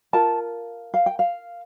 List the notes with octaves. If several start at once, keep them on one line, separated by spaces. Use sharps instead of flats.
F4 A#4 A5
F5
G5
F5